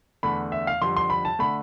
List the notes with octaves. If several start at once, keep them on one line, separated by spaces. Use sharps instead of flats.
E2 D3 A3 B5
E5
F5
F2 D3 G3 C6
C6
B5
A5
D3 A3 B5